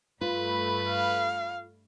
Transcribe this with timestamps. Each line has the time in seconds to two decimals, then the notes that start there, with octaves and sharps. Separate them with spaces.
0.21 G2 A3 F4 B4 B5
0.89 F5